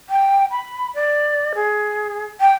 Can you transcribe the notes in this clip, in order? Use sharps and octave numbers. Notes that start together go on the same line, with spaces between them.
G5
B5
D5
G#4
G5